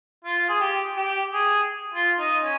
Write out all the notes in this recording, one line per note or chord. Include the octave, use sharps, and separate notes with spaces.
F4
G#4
G4
G4
G#4
F4
D#4
C#4